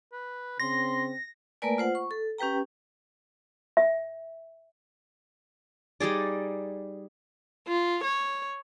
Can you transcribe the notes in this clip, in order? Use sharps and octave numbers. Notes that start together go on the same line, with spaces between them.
B4
C#3 C4 C6 A#6
A3 A#3 A#4 B4 D5 G#5
F4 C5 F#5
C#6
A4
C#4 G4 B4 G5 A#5
E5
G3 D#4 G#4 D5
F4
C#5